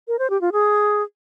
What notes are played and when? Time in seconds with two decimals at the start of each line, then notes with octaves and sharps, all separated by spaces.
0.08 A#4
0.19 C5
0.30 G4
0.41 F4
0.52 G#4